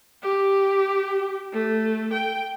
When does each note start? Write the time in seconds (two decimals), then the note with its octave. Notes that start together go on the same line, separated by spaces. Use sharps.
0.23 G4
1.53 A3
2.14 G5